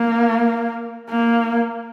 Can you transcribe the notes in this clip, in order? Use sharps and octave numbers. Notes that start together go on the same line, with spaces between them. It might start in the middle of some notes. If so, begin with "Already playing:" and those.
Already playing: A#3
A#3